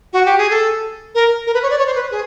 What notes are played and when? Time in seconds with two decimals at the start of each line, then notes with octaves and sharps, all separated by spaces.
0.13 F#4
0.26 G4
0.38 G#4
0.50 A4
1.15 A#4
1.47 A#4
1.54 B4
1.63 C#5
1.71 D5
1.79 C#5
1.87 C5
1.95 B4
2.11 G#4